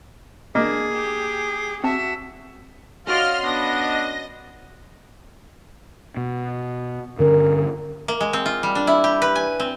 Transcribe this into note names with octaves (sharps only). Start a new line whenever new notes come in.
A#3 D4 G#4 D#5
G4
C4 F#4 E5 A5
C#4 F#4 D5 D#5 F5 C6 F6
B3 D4 D#5 A#6
B2
G2 D3 C#4 A#4
A#3
G#3
C4
F4
G3
D4
E4
G4
B4
G#5
C4